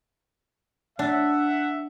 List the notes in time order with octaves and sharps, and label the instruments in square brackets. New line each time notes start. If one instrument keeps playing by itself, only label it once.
[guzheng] D4 [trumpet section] E5 F#5